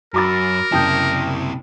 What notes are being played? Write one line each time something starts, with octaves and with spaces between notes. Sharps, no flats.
F#2 F#4 A#4 A#5 B5 D6 E6 A6
F#1 C3 E4 G5 A5 D#6 G6